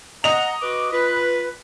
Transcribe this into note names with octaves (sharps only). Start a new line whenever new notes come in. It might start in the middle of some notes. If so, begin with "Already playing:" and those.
D#5 F#5 A#5 F7
F#4 B4 D6
F4 B4